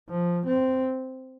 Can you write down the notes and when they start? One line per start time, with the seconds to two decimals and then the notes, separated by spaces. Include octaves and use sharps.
0.10 F3
0.47 C4